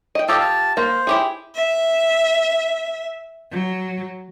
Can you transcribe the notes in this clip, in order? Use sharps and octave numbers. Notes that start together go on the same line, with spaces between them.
D#5 G5
F4 G4 A4 D#5 F5 A5
A5
A#3 C5
E4 G4 G#4
E5
F#3